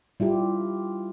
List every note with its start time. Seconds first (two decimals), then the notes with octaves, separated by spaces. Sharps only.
0.20 G3 E4 F4 G4